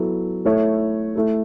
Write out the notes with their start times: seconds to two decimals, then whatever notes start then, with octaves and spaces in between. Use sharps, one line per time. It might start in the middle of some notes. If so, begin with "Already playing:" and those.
Already playing: F#3 B3 E4 A4
0.45 A3 E4 A4 C#5
1.15 A3 E4 A4